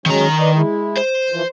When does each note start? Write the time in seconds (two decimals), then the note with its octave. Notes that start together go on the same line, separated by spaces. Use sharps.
0.06 D#3 F#3 G#3 C#4 A#5
0.40 B4 D5 D#5
0.54 G#3 E4
0.97 C5
1.31 E3 F3